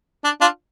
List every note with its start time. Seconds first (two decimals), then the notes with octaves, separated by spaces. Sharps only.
0.24 D4
0.41 D4 F4